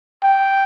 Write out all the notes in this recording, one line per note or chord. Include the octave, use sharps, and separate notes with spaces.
G5